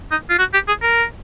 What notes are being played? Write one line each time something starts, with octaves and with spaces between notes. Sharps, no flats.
D#4
F4
F#4
G4
G#4
A#4